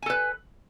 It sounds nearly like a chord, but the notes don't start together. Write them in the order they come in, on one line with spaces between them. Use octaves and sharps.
G#5 A4 B4